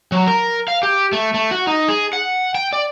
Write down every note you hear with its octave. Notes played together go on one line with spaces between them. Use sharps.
F#3
A#4
F5
G4
A3
A3
F#4
D#4
G#4
F#5
G5
D5